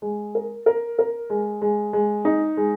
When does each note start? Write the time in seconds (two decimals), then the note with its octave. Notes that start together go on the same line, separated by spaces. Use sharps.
0.02 G#3
0.35 A#4
0.66 A#4
0.99 A#4
1.30 G#3
1.62 G#3
1.93 G#3
2.25 D#4
2.57 G#3